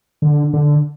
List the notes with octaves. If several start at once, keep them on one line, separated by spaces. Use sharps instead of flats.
D3
D3